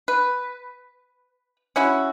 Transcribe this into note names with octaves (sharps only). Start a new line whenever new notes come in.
B4
C#4 E4 F#4